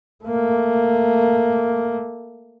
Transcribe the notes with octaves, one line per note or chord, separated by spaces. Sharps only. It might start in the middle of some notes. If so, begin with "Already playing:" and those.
A3 A#3